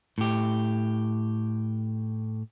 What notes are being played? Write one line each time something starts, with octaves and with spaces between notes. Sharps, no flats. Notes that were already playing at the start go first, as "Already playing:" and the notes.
A2 G4